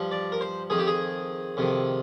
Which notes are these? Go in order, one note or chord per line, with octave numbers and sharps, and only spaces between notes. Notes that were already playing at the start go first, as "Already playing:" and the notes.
Already playing: G2 F3
D5
A#4
C5
F2 D#3 G#4
G4
G#4
F2 C3 D#3